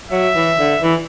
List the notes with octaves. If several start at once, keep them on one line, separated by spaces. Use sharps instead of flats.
F#3 E5
E3
D3
E3